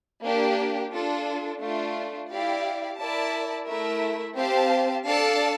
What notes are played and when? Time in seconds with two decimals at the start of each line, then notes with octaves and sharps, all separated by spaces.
0.24 A#3 D4 G4
0.92 D4 F4 A4
1.61 A3 D4 F4
2.30 E4 G4 D5 F5
2.99 E4 A#4 D5 A5
3.67 A3 E4 A#4 E5
4.36 C4 G4 C5 F5 A5
5.06 D4 A4 D5 F5 A5